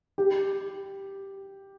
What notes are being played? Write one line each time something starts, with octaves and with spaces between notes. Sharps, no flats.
G4